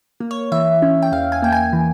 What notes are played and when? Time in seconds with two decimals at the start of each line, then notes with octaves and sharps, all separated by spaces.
0.20 A#3
0.31 C#5
0.52 E3 E5
0.82 C#4
1.02 G5
1.12 E2 F5
1.32 G#5
1.42 A#3 G5
1.52 G#5
1.73 E3